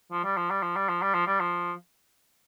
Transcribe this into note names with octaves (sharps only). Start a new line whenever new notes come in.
F3
G3
F3
G3
F3
G3
F3
G3
F3
G3
F3